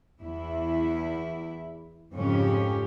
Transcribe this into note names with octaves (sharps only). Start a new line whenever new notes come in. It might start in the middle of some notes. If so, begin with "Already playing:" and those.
E2 E4
F2 G#2 C#3 C#4 G4